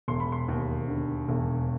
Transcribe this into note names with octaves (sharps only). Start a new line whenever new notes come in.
E1 C6
B5
C6
D#2
D3
E1